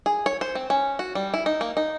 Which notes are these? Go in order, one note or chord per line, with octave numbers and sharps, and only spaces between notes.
G#4
C#5
C5
C4
C#4
F#4
G3
E4
D#4
A#3
D#4